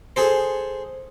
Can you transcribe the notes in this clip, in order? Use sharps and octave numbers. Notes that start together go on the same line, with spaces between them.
G#4 A4 C5